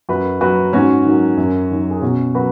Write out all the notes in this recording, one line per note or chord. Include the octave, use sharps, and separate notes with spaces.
F#2 F#4 B4
F#3 F#4 B4
G#2 C#4 F#4
D#3 F#3
F#2
D#3 F#3
G#4
B2 C#4 F#4
F#3 F#4 B4